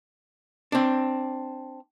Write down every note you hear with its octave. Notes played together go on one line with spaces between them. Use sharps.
C4 D4